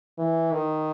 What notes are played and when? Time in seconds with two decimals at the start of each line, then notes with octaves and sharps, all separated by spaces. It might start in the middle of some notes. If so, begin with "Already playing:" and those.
0.18 E3
0.52 D#3